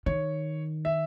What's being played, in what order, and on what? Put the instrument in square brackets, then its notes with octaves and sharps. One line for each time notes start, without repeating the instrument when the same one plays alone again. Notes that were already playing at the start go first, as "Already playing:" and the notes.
[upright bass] D#3 [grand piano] C#5
[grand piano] E5